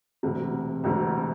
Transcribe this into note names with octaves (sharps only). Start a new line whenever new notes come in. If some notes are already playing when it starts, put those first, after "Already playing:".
E1 D2 C3
E1 D2 C3